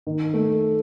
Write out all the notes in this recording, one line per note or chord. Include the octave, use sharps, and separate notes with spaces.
D#3
A3